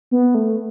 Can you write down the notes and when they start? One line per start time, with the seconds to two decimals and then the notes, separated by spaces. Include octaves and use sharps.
0.11 B3
0.35 A3